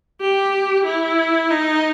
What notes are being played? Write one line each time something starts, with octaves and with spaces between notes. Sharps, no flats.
G4
E4
D#4